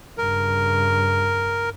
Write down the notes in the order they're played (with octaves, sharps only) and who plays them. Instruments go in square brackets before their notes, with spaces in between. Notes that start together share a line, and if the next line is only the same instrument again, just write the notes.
[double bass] G2 C#3 [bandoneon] A#4